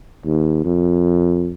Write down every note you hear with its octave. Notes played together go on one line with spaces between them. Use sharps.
D#2
F2